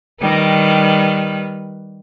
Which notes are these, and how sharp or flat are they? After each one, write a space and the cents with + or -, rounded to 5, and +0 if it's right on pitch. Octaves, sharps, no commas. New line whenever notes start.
D#3 +0 G3 +0 B4 +0